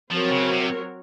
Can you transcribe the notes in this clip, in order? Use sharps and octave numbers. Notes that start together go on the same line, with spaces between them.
F3 F#3 C4 F#4 A#4 C#5
C#3
C3